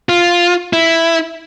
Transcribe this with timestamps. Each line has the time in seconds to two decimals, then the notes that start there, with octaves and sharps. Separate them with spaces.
0.09 F4
0.73 E4